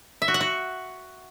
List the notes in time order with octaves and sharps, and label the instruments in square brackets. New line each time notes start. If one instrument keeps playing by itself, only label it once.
[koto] E5
F#4
F#5
F#4